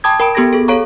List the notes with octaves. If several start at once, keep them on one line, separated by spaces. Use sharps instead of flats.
G5 A5 B5 D6 D#6 G#6
A#4 G5 B5 D7
B3 G4 A4 B5 G#6 A#6
G#4 A4
A4 C#5 F5 A#5 C#6